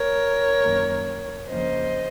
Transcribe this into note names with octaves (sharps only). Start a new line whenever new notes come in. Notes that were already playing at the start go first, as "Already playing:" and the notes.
Already playing: A#4 C#5
F#2 D#3 A#3
F2 C#3 F3 A#3 C5 D#5